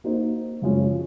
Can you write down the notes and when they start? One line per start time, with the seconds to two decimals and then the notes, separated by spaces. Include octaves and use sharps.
0.04 A#3 D#4 F#4 C5
0.62 F#2 C#3 F3 G#3 C#4